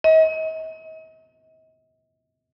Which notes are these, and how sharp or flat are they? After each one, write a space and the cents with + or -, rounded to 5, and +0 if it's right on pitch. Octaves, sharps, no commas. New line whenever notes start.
D#5 +40